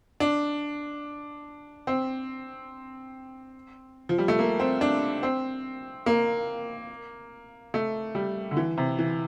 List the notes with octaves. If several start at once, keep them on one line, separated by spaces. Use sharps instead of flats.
D4
C4
F3
G3
A3
A#3
C4
D4
C4
A#3
A3
G3
D3
E3
C3
E3